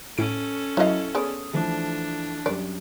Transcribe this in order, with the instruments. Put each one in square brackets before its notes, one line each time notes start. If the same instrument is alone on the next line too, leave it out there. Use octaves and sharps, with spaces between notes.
[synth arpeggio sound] A2 D7 [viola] C#4 A4
[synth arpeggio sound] F#3 D#5 [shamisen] E4 F5
[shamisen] B3 G#4 D5 [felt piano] C#5 D#6
[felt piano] E3 F3 A3 [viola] D4
[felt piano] F#2 G3 [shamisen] D5